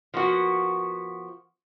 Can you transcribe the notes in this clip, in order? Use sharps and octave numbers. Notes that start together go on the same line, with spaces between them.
F3 A#3 B3 F#4